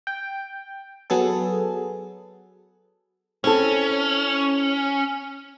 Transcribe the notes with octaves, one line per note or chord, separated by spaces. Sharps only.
G5
F#3 B3 G#4 A4
C4 C#4 E4 A4